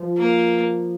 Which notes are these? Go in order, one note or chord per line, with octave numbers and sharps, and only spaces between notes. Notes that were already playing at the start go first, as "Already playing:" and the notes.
Already playing: F3
A#3